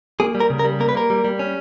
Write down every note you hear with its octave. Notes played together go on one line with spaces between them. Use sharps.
A#3 G#4
G3
A#4
C#3
A#4
G3
A#3 A#4
B4
A#3 A#4
G3
G3
C#4